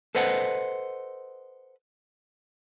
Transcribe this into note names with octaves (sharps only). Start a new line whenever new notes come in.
A4 B4 C5 D#5 F#5